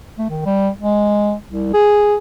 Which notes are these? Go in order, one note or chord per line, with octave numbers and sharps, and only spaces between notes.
A3
D#3
G3
G#3
C2
G#4